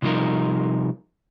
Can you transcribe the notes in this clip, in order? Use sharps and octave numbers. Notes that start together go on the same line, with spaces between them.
C3 F3 G3 D#4 A#4